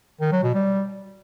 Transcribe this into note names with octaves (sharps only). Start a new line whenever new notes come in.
D#3
F#3
B2
G3